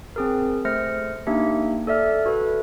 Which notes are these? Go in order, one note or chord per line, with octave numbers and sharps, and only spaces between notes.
C4 G#4 A#4
A3 C5 F6 A#6 C#7
A#3 D4 D#4 G4 E5
A4 D5 E5 F6
F#4 A4 B4